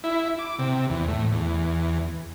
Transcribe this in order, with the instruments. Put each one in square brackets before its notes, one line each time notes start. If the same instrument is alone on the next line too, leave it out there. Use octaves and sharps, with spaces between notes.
[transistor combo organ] E4
D6
C3
E2
A2
E2